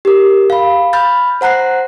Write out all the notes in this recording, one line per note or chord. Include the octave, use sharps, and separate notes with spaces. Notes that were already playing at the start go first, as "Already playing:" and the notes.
G4 A#4
F5 B5
B5 F6 G6 A6
C5 F#5 A#5 F#6 C7